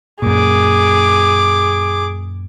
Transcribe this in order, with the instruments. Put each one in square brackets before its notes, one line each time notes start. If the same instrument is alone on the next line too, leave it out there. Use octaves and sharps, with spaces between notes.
[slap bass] F#2 A#2 [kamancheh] G#4 D6